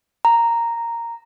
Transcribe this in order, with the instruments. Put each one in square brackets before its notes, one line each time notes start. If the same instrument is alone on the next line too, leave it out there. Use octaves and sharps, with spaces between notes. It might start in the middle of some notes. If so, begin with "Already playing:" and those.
[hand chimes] A#5